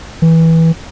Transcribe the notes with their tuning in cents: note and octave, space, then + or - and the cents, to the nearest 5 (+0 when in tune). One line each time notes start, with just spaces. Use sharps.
E3 -15